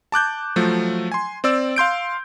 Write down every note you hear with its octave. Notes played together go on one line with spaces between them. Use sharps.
A5 D6 F#6 G6
F3 F#3 A3
G#5 C6
C4 D5 E6
F5 C6 G6 D7